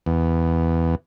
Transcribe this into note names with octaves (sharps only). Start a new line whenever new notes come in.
E2